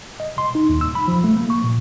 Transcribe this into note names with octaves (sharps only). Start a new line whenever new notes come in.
D#5
C6
D#4
D#2
E6
B5
F3
A3
A#3
C#6
A#2